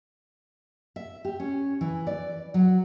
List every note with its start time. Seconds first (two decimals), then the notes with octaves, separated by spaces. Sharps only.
0.96 E5
1.25 G4
1.40 C#4
1.81 E3
2.07 D5
2.54 F#3